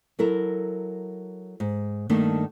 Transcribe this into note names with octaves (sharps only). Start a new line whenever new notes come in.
F#3 E4 A4 A#4
G#2
G2 D#3 A3 A#3 D4 D#4